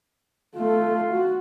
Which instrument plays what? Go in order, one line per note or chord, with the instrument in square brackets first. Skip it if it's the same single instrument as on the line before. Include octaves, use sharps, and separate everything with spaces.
[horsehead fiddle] A3 A4 [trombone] F4
[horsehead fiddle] F#4